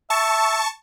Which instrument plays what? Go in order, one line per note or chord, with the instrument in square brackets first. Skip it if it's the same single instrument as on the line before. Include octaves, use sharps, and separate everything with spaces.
[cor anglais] E5 [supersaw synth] A5 C#6